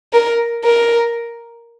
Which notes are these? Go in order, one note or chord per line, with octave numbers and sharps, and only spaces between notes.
A#4
A#4